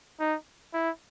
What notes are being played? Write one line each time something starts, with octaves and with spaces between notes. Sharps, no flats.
D#4
E4